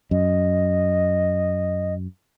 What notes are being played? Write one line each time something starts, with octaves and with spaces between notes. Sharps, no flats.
F#2 D#5